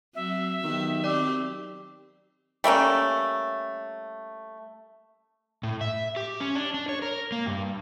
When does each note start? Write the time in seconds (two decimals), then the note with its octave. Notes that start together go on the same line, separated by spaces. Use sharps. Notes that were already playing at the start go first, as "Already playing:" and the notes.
0.15 F#3 C4 E5
0.64 D#3 F#3 B3 G4
1.04 C4 G4 D5 G5 D6
2.64 G3 A3 A#3 C#4
5.63 A2
5.81 E5
6.16 G4
6.40 C#4
6.55 D4
6.74 D4
6.89 C#5
7.02 A#4
7.32 A#3
7.46 G2